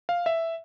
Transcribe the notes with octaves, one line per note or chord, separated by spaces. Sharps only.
F5
E5